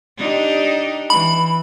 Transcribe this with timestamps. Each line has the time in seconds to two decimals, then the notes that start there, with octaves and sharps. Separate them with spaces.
0.17 D4 D#4 G4
1.10 E3 B5